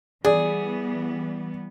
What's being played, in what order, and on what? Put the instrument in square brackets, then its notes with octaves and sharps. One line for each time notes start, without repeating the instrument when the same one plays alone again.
[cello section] E3 G3 B3 [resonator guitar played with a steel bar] G#4 [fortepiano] D5